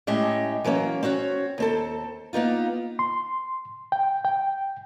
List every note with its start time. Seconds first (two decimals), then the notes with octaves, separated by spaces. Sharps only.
0.07 A2 G#3 C#4 G4 D#5 E5
0.64 E3 F#3 A#3 C#4
1.03 C4 C#4 F#4 C#5
1.58 D#2 C4 A4
2.33 A#3 B3 D#4 F4
2.99 C6
3.92 G5
4.25 G5